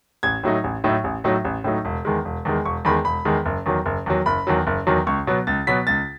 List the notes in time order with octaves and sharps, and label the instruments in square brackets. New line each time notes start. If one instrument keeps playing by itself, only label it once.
[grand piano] A1 G#6
A2 F#3 A3 D#4
A1
A2 F#3 A3 D#4
A1
A2 F#3 A3 D#4
A1
A2 F#3 A3 D#4
E1
E2 D#3 G#3
E1
E2 D#3 G#3
E1 C#6
E2 D#3 G#3 B5
E1 B5
E2 D#3 G#3
F#1
E2 D#3 F#3
F#1
E2 D#3 F#3
F#1 B5
E2 D#3 F#3
F#1
E2 D#3 F#3
C#2 C#6
B2 F#3 B3
C#2 A6
B2 F#3 B3 B6
C#2 A6